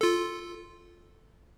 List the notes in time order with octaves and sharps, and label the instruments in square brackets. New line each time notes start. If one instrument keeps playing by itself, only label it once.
[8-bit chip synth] F4 A4